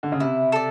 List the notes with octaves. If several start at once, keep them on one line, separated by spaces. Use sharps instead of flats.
D3
C#3
C3 E4
A4 D5